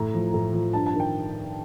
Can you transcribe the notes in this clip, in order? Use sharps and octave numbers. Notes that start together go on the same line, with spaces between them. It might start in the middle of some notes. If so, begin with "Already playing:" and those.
Already playing: A2 A#5
F3
A2
F3
G2 A5
A5
D#3
G5